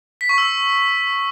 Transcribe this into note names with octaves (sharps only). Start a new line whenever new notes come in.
B6
C#6
E6